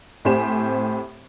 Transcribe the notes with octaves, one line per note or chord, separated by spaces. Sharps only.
A2 C4 G4 C5 G#5 E7